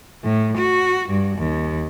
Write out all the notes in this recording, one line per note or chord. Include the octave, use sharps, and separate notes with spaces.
A2
F#4
G2
D#2